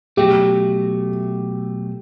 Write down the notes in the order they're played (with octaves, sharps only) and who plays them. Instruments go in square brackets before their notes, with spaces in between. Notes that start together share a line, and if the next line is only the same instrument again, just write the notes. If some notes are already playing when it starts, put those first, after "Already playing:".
[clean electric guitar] B2 F#3 A3 [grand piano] G4